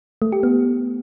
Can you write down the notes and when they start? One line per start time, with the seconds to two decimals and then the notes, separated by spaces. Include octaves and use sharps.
0.22 A3
0.32 G4
0.43 B3